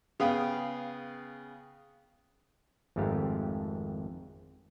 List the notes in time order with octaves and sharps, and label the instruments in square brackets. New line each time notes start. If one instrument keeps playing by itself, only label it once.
[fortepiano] C#3 B3 G#4 F5 G5 D#6
[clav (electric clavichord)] G#1 F2 G#2 A3 G4 F5